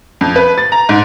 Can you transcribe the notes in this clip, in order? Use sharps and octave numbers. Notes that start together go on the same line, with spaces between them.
F2
B4
A6
A#5
G#2